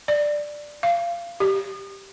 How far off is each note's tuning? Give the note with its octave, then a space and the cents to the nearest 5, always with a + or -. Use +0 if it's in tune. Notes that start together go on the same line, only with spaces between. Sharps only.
D5 +10
F5 -20
G4 -10